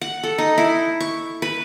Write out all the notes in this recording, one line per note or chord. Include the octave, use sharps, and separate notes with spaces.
F#5
A4
D#4
E4
C#6
B4